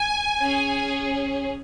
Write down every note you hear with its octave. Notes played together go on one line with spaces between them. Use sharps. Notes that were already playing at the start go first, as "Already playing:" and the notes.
Already playing: G#5
C#4 G#4